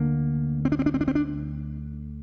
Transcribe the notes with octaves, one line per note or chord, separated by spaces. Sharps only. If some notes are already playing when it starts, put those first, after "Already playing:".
Already playing: D2 D3 A#3
C4
D4
C4
D4
C4
D4
C4
D4